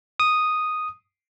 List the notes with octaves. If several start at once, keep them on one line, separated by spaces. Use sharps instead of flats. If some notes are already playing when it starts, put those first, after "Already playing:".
D#6